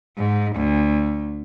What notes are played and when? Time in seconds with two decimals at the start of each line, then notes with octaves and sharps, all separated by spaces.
0.18 G#2
0.56 D2